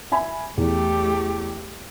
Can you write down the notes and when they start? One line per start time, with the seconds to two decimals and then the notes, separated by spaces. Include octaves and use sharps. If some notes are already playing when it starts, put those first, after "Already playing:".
0.12 E5 G#5 B5
0.57 E2 A3 G4